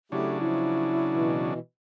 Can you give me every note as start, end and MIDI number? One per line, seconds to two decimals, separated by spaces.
0.12 1.54 49
0.12 1.54 54
0.12 0.37 57
0.12 1.54 62
0.12 0.37 64
0.12 0.37 67
0.39 0.89 53
0.39 1.52 64
1.11 1.59 47
1.11 1.59 52